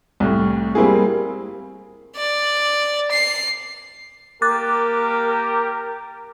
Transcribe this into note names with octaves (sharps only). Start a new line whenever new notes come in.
C2 A2
G3 A#3 C4 E4 G4 G#4
D5
C7
A#3 G4 A#4 D6 F#6 A6